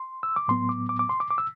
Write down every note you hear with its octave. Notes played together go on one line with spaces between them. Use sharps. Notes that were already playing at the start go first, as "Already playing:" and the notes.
Already playing: C6
E6
D6
A2 F#3 B3 C6
D6
D6
D6
C6
D6
D6
E6